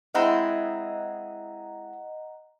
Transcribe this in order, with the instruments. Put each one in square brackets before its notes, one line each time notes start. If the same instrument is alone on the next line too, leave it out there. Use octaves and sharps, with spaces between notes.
[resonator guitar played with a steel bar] G#3 C4 E4 [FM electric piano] D#5 F#5 A#5